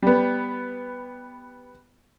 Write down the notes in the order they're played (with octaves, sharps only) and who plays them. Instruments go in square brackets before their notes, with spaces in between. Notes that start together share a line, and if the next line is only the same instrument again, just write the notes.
[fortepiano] G3 B3